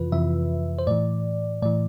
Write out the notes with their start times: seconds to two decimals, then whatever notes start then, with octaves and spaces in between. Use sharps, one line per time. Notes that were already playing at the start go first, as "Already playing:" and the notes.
Already playing: F2 C3 E3 F4 B4
0.12 F2 C3 E3 E5
0.78 C5
0.87 A2 E3 D5
1.62 A2 E3 D5